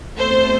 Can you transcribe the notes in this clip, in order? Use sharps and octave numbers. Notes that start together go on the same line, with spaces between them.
E2 B2 A3 C4 C5